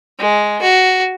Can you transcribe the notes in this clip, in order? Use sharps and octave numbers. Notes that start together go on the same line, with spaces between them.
G#3
F#4